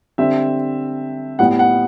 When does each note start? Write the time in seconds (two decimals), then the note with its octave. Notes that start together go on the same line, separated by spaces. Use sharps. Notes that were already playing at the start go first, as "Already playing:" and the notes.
0.18 D3 G3 C4 E5
1.39 A2 G3 B3 F#5
1.59 F#5